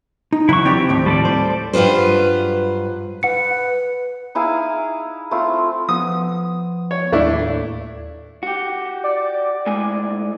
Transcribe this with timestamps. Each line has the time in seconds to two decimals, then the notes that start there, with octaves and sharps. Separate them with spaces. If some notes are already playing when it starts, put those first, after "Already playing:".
0.33 D#4
0.49 C#3 E3 F#3 E4 C#6
0.65 C4 E4 G4 D5 G5
0.89 D#2 A2 F3
1.06 G3 A4 D5
1.25 C5
1.73 G2 F#3 F4 B4 C5
3.23 B4 F#5 C#7
4.35 D#4 E4 G#4 F5
5.31 A3 C4 E4 F4
5.89 F3 B3 D#6
6.91 C#5
7.12 D#2 A2 A3 D4 E4
8.43 F#4 G4
9.04 D5
9.67 A2 G#3 G#5